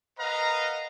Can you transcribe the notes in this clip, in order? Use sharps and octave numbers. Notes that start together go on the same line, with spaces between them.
A#4 B4 D#5 F5 F#5 A#5